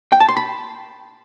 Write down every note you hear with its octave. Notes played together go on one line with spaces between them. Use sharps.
G5
A5
C6
B5